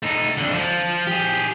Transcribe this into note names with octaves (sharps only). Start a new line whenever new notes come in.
A3 D#4
F2 D3
F3
G4 G#4